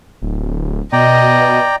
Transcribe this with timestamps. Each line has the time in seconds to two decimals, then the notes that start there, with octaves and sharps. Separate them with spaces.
0.22 D1
0.93 B2 D5 D#5 G5 A#5